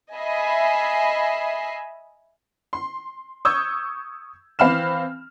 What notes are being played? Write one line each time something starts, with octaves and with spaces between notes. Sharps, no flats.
D#5 E5 G#5 B5 C7
C6
C#6 D#6 E6 G6 G#6
E3 C4 F5 B5 F6 E7